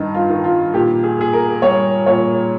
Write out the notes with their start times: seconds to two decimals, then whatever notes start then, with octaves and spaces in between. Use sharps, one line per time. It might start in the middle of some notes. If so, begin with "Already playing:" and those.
Already playing: G2 D#3 D#4
0.14 F4
0.30 D#3
0.44 F4
0.74 A#2 G4
1.04 G#4
1.18 A#2 G#4
1.33 A#4
1.62 G3 C#5
2.06 A#2 C#5